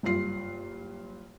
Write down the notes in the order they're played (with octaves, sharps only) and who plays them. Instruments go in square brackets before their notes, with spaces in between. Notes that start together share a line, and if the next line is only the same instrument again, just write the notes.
[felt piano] F#1 G2 F4 C7